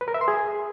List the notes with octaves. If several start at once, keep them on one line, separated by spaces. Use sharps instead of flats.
B4
A#4
E5
C6
G#4